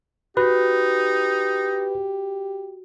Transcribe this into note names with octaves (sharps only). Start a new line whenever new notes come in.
D#4 F#4 G4 B4